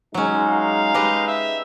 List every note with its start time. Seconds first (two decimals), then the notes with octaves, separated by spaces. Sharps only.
0.14 F#3 G#3 C#4 D#4
0.49 F5
0.94 G4 B4 D#5
1.27 E5